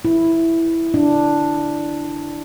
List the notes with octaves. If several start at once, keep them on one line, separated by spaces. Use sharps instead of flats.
E4
D4